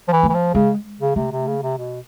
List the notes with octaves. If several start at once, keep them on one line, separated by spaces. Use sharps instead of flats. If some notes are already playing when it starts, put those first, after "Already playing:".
F3
E3
A3
E3
F3
C#3 G#3
C#3
C3 A3
C3
C#3
C3
B2